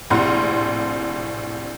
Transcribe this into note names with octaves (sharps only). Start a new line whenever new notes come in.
A#1 A2 C3 F#5 C6 F6